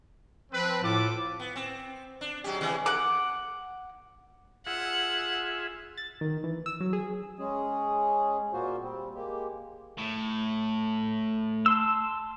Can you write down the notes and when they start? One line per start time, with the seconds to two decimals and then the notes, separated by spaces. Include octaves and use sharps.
0.52 F3 C4 B4
0.83 A2 F4 A4 D6
1.40 B3
1.56 C4
2.21 D4
2.44 F#3 G#3 G4
2.61 C3 E3 G#3
2.86 F#5 D6
4.67 F4 G#4 E5 F#5
5.98 A6
6.21 D#3
6.44 E3
6.66 E6
6.80 F#3
6.93 G#4
7.39 G#3 C#4 G#4
8.53 A#2 A#3 F4 F#4 C5
8.82 G3 C4
9.14 G#3 A#3 G4
9.98 A2
11.66 A5 C6 E6